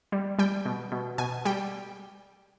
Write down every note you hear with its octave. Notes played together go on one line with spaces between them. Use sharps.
G3
G3 G5
B2
B2
B2 G#5
G3 G5